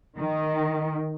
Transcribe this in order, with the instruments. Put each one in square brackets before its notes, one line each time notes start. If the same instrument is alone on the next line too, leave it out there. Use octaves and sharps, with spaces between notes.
[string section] D#3